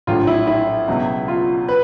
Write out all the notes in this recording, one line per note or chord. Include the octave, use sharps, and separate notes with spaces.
A#1 A2 F#3 F4
E4
E4
C#2 B2 F#3
F4
B4